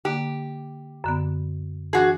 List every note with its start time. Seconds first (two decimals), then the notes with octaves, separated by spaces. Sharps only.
0.05 D3 A#3 G4
1.04 F#2 D3 B3
1.93 E3 D4 F#4 G#4